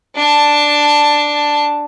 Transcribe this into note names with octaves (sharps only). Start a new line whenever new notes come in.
D4 A5